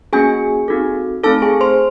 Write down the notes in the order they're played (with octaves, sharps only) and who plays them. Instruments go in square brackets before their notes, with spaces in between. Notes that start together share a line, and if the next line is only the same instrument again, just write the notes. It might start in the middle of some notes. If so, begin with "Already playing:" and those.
[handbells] A#3 C#4 F#4 G#4 G#5
C4 D#4 F#4 A4
A3 C4 D#4 A4 A5
G#4 G#5
C5 C6